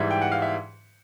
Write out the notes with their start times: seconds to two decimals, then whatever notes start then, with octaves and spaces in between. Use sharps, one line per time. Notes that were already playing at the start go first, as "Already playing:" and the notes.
Already playing: G#2 E3 G3 E5
0.11 G5
0.21 F#5
0.32 F5
0.42 E5